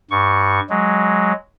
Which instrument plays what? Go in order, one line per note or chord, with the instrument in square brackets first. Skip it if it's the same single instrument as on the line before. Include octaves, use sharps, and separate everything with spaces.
[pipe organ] G2 C#6
F#3 G#3